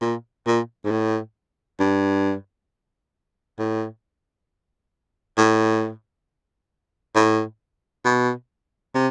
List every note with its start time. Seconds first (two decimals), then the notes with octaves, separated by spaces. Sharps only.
0.02 A#2
0.46 A#2
0.84 G#2
0.91 A2
1.80 G2
3.59 A2
5.37 A2
7.15 A2
8.05 B2
8.94 C3